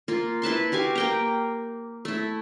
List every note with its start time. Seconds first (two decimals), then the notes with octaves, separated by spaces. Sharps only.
0.08 A#3 F4
0.42 E4 B4 A5 C6
0.72 F#4 G4 F5 G#5
0.95 A#3 G5 A#5
2.05 A3 E4